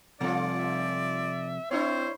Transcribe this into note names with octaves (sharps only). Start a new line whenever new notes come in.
C3 F3 G3 F4 A4 D5
E5
C4 D4 E4 C5 C#5